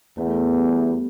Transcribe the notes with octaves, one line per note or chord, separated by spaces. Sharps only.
E2 B3
A3
B3
G3